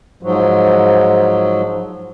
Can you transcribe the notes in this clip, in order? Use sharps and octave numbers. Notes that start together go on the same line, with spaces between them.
G#2 F3 F#3